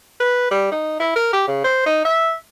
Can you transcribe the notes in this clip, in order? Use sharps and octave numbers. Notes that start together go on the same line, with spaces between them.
B4
G3
D#4
E4
A#4
G4
C#3
C5
D#4
E5